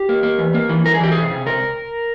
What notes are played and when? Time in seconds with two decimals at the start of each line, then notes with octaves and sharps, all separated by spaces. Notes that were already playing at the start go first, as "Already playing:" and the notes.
Already playing: G4
0.09 A#3
0.23 A#3
0.38 E2
0.54 A#3
0.69 E3
0.86 E3 A#4
0.94 G#4
1.00 E3 G4
1.12 C3 G#4
1.31 C3
1.46 C3 A#4